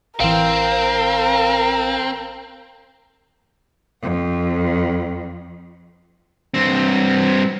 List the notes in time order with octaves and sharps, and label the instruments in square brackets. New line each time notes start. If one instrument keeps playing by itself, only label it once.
[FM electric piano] A1 E3 [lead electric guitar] C4 [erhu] A#4 [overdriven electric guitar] F5
[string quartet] F2
[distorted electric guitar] G2 C4